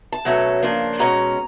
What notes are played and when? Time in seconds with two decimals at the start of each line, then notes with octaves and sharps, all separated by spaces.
0.12 A5
0.25 B2 F#3 A3 C#4
0.62 C#3 F3 A#3 D4
0.99 B2 G#3 C#4 A#5